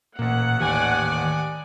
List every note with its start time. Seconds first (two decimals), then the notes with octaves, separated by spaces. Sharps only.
0.19 A1 A#2 A#3 F#5
0.60 A1 D#2 D#3 G4 D5 G#5